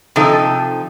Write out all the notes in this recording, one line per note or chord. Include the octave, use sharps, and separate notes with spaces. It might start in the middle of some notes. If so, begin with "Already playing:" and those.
C3 F3 D#4 A4